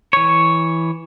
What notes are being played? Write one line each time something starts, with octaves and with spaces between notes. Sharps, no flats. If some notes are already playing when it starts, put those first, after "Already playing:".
E3 C#5